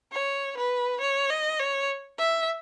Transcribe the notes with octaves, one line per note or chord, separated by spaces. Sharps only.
C#5
B4
C#5
D#5
C#5
E5